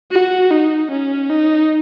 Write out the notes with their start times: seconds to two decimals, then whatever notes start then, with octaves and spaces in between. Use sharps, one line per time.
0.11 F#4
0.50 D#4
0.91 C#4
1.30 D#4